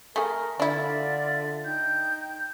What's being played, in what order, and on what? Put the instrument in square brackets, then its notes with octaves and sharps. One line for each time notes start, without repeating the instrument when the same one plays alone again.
[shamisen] A3 G#4 [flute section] A#4
[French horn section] D3 [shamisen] D4 E4 [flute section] F4 D5 E5
[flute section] D#4 G5 G6